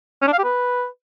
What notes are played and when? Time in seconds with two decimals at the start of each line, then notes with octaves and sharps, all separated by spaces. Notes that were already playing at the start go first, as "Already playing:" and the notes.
0.22 C#4
0.27 D4
0.33 F5
0.38 G4
0.44 B4